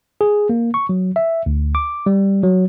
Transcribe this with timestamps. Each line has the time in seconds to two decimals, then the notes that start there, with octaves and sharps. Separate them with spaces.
0.21 G#4
0.49 A#3
0.74 C#6
0.89 F#3
1.16 E5
1.46 D2
1.75 D6
2.06 G3
2.44 F#3